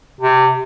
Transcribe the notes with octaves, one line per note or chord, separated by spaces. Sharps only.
C3